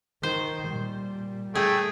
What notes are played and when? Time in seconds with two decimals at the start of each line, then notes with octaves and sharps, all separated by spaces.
0.23 D#3 C5
0.68 A#2 G3
1.55 A3 G#4 G5